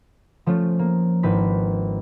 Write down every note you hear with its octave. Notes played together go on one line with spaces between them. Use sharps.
F3 A3 C#4 F4
A#3
G#1 E4 B4 G6 B6